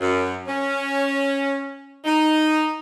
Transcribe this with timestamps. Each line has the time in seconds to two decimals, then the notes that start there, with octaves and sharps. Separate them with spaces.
0.01 F#2
0.48 C#4
2.05 D#4